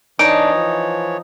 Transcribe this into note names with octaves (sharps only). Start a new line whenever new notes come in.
E3 D4 D#4 C#5 D7
F3